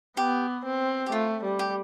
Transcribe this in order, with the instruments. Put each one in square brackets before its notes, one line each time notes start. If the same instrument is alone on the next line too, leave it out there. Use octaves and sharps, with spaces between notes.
[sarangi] B3 [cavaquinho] G4
[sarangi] C4
[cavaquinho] G4
[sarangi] A3 [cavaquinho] F4
[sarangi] G3
[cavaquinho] G4